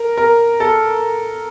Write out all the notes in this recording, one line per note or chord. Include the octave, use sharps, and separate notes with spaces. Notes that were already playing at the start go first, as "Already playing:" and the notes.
Already playing: A#4
A#4
A4